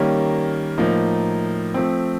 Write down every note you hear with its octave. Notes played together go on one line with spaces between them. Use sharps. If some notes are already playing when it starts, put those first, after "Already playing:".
Already playing: D#3 G3 A#3 C#4
A2 F3 A#3 D#4
F3 A3 C4